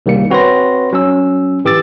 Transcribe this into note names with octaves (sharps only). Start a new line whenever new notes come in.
C2 D#3 G3 A#3 C#7
C4 F#4 B4 C#5 C6 A#6
F#3 C#4 E6
G#1 E3 G4 D6 E6 A6